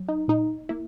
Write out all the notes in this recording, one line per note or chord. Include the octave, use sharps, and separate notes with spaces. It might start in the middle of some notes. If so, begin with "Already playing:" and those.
Already playing: F#3
D#4
A#2 D#4
A#3 E4